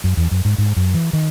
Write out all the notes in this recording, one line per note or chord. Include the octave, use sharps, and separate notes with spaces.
F#2
E2
F#2
G#2
G#2
F#2
E3
D#3